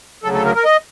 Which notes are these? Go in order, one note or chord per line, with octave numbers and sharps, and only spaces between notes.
D2 C#3 F#3 A4
A4
A#4
A#4
D#5